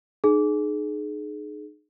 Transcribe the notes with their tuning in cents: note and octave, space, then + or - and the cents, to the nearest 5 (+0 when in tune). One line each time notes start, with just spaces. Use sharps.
D#4 -35 G#4 +25